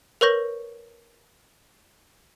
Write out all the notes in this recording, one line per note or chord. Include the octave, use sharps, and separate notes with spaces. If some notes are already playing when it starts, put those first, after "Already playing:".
A#4 B4 C#5 C#6 G6 A#6